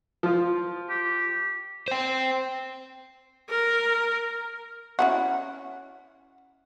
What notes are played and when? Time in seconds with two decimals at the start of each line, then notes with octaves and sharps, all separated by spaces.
0.23 F3 F4
0.90 G4
1.88 C5 G5
3.50 A#4
4.99 C#4 E4 F#4